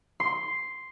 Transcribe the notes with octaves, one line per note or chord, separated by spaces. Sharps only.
C6